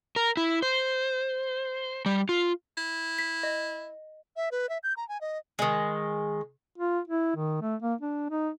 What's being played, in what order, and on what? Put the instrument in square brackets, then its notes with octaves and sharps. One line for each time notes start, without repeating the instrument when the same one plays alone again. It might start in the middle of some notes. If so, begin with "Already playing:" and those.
[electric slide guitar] A#4
E4
C5
G3
F4
[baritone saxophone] E4
[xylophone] B6
D#5
[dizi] E5
B4
E5
G6
A#5
G#5
D#5
[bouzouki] D#3 G#3
[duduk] F4
E4
D#3
A3
A#3
D4
D#4